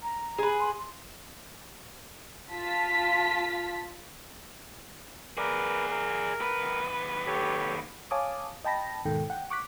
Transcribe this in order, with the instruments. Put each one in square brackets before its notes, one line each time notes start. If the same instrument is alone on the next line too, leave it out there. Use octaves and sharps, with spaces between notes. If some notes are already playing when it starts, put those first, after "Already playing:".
[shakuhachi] A#5
[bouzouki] G#4 B4
[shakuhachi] C6
[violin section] F4 A5 B6
[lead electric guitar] G#4 D5 [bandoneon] A#4 B4
[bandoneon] A#4
[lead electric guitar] D#2 B4
[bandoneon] G4 A4 C#5
[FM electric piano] C#5 F5 G#5 A5 D6 D#6
D#5 G5 A5 B5 A#6
D#2 G#2 B2 D#3 A4 G5
F#5 G5
C#6 D6 F#6 B6